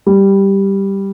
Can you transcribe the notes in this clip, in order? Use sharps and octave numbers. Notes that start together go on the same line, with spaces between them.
G3